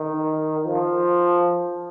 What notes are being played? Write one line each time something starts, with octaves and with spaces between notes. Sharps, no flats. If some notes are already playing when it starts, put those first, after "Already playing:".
Already playing: D#3
F3